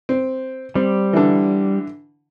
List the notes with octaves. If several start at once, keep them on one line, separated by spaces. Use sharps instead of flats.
C4
G3 C4
D3 E3